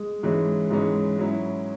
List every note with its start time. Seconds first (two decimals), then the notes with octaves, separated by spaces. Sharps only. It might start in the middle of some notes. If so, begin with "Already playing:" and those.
Already playing: G#3
0.23 G#2 E3 G#3 C#4
0.70 G#2 E3 G#3 C#4
1.18 G#2 F#3 C#4 E4